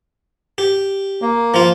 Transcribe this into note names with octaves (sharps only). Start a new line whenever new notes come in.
G4
A#3
F3 F4